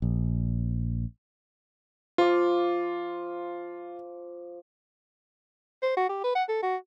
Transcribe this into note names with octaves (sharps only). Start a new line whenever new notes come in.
A#1
F3 F4 D6
C5
F#4
G4
B4
F#5
A4
F#4